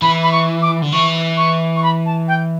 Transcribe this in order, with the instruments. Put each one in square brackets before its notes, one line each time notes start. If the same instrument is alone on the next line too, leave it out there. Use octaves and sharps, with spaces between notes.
[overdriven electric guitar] E3 [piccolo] B5
[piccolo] B5
C#6
D6
[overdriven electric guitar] D3
[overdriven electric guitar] E3 [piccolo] C#6
[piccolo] C#6
C#6
B5
A5
G5